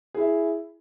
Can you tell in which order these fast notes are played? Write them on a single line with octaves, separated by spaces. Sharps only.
G#4 E4 E5